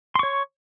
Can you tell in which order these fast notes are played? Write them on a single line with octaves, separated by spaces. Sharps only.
C6 C#6 C#5